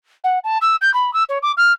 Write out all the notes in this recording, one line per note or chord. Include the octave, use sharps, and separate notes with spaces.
F#5
A5
E6
G6
B5
E6
C#5
D6
F6